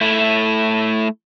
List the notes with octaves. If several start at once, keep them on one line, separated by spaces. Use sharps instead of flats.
A3 E4